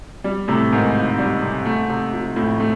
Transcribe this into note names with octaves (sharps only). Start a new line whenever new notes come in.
G3
A2 C3
G#2 D#3
C#2
G3
C3
A3
C3
F3
F2 A2
A3